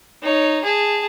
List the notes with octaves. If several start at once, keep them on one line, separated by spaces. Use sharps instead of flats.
D#4 C#5
G#4 A5